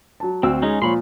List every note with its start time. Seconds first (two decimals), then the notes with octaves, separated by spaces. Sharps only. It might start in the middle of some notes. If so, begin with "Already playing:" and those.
0.20 F#3 A5
0.43 D2 C4 F#4 E6
0.63 G#3 C#4 D#4
0.82 A#2 F3 C#5 B5 C6